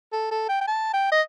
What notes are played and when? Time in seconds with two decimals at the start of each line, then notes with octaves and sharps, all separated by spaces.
0.13 A4
0.31 A4
0.49 G5
0.61 G5
0.67 A5
0.94 G5
1.12 D#5